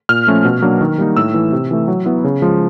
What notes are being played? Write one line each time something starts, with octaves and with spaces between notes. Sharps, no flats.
A#2 F6
F3 A3 C#4
B2
F#3 A#3 D4
D#3
G3 A#3 D#4
A2 E6
E3 A3
C3
E3 A3
F#3
B3 E4
C#3
F3 G#3